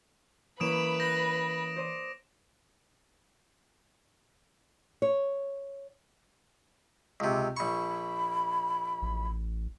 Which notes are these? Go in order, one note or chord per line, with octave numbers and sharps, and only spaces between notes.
E3 A#3 C#4 B4 B5 D#6 D7 E7
F#6 G6 A#6
C5 D5 D#6
C#5
C#2 C3
A#1 B5 C#6
A1